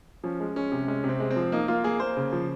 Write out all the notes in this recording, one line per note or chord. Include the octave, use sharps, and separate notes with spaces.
F3 C#4
G#3
G#3 C#4
C3
G#3 C#4
C3
C4
G#3
C4
F3
A#3 D#4
A#3 F4
A#3 G#4
A#3 C5
C#3
F3